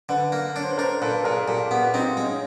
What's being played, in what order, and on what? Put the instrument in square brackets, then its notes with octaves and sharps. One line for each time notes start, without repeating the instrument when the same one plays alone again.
[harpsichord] D3 [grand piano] A4 B4
[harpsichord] A#3
[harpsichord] D4 [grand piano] C#5
[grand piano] C5
B4
[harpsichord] D4 [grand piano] A#4 C5
[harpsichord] A#2 [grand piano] A4 B4
[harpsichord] A#2 [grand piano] G#4 A#4
[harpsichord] A#2 [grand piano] G4 A4
[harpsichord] B3 [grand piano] G4
[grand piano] F#4
[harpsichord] C4 [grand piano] D#4 F4
[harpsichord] G#3
[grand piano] C#4 D#4